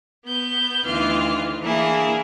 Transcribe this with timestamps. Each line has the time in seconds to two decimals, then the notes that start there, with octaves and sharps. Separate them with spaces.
0.25 B3 B4 G6
0.84 D2 D#3 E3 F4 F6
1.61 E3 A#3 D4 E4 G#4